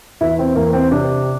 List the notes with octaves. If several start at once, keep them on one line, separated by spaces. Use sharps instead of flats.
E2 E4
C4
E2 A#3
C4
C3 D4